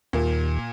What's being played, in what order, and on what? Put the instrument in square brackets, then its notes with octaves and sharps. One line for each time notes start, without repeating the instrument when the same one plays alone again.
[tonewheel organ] D#2 [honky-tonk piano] A#2 A#3